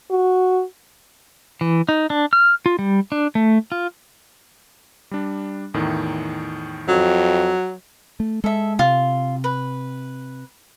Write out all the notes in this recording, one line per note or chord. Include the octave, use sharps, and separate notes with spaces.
F#4
E3
D#4
D4
F6
F4
G3
D4
A3
F4
G3 D4
E2 A2 D#3
F2 F#3
A3
G#3 A4 E5
C3 F4
B4